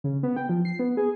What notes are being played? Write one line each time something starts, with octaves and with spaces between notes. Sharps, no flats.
C#3
B3
G5
F3
C7
B3
G#4